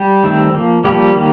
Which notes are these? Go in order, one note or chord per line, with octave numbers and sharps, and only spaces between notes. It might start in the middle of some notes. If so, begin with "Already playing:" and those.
Already playing: G3 G4
D#3 A3 C4
F3 A#3
F3 G3 A#3 G4
D#3 A#3